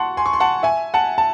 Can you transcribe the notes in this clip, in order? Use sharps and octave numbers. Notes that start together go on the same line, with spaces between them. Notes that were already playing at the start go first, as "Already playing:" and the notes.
Already playing: F#5 A5 C6 C#6
G#5 C6
C#6
C6
F#5 A5
E5 G#5
F#5 A5
A5